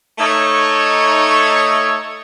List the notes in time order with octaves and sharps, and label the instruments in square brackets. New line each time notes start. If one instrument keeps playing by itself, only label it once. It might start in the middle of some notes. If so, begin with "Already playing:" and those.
[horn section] A3 D#4 C#5